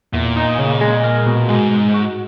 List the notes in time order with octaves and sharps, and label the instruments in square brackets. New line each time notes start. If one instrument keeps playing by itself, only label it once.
[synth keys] E2 [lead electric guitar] A#2
[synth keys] D#4
C#3
G#3
A#4
B2
[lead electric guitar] G#2 [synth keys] G#3
[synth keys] G#3
F#4